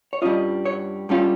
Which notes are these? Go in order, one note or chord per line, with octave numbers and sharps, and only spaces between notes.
C#5
G2 G3 C#4 F4 D#5
C#5
G2 G3 C#4 F4